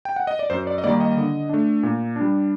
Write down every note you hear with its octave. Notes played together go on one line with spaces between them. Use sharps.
G5
F#5
D#5
D5
F#2 C5
D5
D#5
D#3 G3 A#3 D5
D#5
D3
A3 D4
A#2
G3 D4